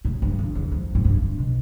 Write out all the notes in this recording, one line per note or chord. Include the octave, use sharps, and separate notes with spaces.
A2
G2
F2
E2
F2
A2
G2
B2